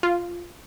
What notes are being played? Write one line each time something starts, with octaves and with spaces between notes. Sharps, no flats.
F4